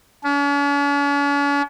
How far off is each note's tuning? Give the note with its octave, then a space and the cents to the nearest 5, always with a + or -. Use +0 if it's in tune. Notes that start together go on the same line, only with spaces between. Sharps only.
C#4 +45